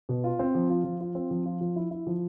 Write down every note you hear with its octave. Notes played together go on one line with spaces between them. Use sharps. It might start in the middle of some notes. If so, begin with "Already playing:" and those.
B2
F4
C4
F3
F4
F3
F4
C4
F3
F4
F3
E4
E4
F3